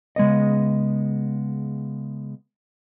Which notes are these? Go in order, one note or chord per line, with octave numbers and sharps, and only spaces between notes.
C#3 G#3 B3 D#5